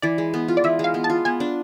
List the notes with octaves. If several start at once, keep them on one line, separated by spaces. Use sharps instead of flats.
E3 D5
G#3
B3
F4
D5
E3 E5
G#3
F5
B3
A5
F4
B3 G#5
D4